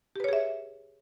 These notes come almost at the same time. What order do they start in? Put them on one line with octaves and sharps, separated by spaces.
G4 B4 C#5 G#4 E5